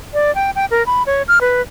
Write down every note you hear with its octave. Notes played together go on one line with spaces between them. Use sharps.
D5
G5
G5
A#4
B5
C#5
F6
B4